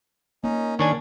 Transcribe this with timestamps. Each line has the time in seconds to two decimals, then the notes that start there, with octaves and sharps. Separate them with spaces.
0.44 A#3 C#4 D#4
0.79 D#3 C#4 D4 C#5 G#5